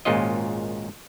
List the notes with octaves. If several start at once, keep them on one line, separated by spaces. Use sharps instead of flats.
G#1 A#2 G#3 C#4 F4 D#5